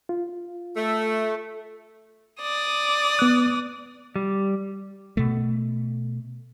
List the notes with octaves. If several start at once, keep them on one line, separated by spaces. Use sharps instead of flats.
F4
A3
D5 D#6
B3 F#6
G3
B2 A3